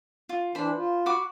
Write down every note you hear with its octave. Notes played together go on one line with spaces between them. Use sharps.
F4
E3 D4 C5 B5
F4
F#4 B5 D6